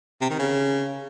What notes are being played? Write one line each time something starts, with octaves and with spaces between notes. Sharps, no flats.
C3
D#3
C#3